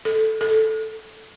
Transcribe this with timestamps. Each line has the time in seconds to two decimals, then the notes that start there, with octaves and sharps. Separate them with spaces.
0.05 A4
0.41 A4